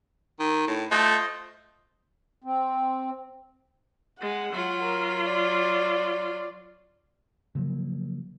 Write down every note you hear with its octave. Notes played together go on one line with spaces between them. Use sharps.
D#3
A2
A3 F4 C5 D#5
C4
G#3 F#5
F#3 F4
A#4
D5
C#3 F3 F#3 A#3